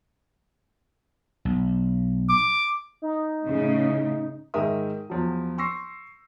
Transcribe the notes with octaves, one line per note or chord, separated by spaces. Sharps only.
B1
D6
D#4
A2 C#3
G#2 D#3 G#3 A#4 E5 D#6
E2 F3 F#3
C6 C#6 E6 A#6 C7